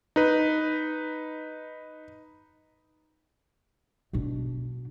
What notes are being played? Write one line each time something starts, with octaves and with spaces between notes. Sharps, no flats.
D#4 B4
B2 D4